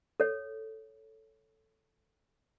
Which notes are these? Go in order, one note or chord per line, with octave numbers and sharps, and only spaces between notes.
A4 C#5